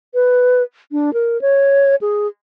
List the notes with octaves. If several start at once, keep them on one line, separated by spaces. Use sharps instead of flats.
B4
D4
A#4
C#5
G#4